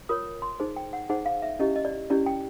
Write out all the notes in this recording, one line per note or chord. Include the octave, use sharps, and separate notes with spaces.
F4 A#4 C#5 D#6
C6
D#4 G#4 C5
G5
F#5
D#4 G#4 C5 F#5
F5
E5
C#4 E4 G4 D#5
D#5
D5
C#4 E4 G4 D5
G5